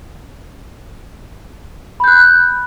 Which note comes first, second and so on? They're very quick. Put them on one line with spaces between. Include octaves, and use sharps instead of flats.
B5 G6 F#6